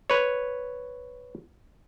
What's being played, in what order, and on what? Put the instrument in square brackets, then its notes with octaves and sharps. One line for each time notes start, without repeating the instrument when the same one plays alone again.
[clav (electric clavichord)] B4 C#5